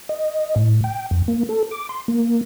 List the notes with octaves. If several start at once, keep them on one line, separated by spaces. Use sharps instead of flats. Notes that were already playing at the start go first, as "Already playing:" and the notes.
D#5
A2
G5
F2
A#3
A4
D6
C6
A#3